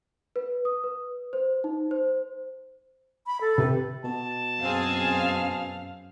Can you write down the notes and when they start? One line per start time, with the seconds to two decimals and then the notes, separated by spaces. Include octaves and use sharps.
0.36 B4
0.65 D#6
0.84 B4
1.33 C5
1.64 D#4
1.91 C5
3.26 B5
3.41 A4
3.58 C3 G4 B4
4.04 B2 A5
4.62 F#2 C4 G#4 F5